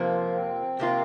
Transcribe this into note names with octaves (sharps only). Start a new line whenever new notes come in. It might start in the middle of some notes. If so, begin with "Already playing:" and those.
Already playing: F2 C3 F3 A#3
C4
C3 A#3 F4